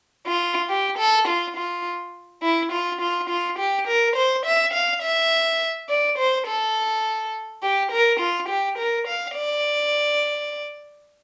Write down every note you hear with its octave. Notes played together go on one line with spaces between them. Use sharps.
F4
G4
A4
F4
F4
E4
F4
F4
F4
G4
A#4
C5
E5
F5
E5
D5
C5
A4
G4
A#4
F4
G4
A#4
F5
D5